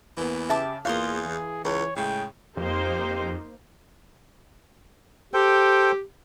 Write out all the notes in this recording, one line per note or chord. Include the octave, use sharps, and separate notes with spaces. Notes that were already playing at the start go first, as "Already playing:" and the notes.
E2 E3 A#3 B3
C#3 G4 E5 A5 D6
E2 A#3 F4 G#4 F5 C6 D#6
E3
C#2 E3 C#5
A2 C#3 G#3 G5
F2 A#3 D#4 G4 C5
G4 A4 C5 G5